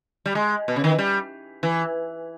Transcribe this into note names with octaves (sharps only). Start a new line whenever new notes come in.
G3
G#3
B2
C#3
D#3
E3
G3
E3